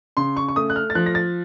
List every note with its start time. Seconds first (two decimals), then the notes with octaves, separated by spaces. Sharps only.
0.17 C#3 C6
0.37 C#6
0.48 C#6
0.56 A3 D#6
0.70 F#6
0.76 F6
0.90 A6
0.95 F3 F#6
1.06 A#6
1.15 A6